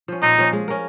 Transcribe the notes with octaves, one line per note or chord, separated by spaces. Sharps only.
F3 C#4
A#2 D#4
F3 C#4
G#3
C#4 A#4